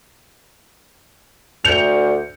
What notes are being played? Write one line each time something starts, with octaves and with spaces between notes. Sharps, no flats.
D2 G6 C#7 F7